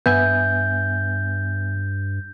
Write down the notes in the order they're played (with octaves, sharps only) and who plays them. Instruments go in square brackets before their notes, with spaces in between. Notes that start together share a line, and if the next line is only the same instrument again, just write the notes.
[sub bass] G2 [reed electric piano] B3 E5 G#5 [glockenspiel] G6